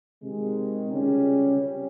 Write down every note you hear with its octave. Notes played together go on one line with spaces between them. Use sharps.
C3 D#3 G#3
C#2 C#3 G3 C#4
C3 G3 C#4